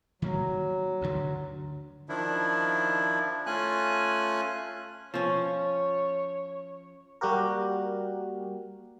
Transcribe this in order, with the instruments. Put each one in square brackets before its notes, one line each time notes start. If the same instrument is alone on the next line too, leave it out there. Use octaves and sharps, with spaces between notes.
[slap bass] D#3 G3 A#3 [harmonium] F#3
[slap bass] D2 G2 D3
[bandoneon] D#3 F3 D4 E4
A3 C#4 F4 G#5 F#6
[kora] F3 C#4 [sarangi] C#5
[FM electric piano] G3 A#3 F#4 G4 A#4